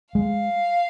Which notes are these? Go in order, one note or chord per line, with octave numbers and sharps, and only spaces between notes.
G#3 F5